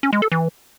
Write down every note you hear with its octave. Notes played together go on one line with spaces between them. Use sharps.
C#4
G#3
A4
E3